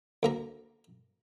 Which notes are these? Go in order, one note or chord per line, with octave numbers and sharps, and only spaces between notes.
D2 A#3 A#5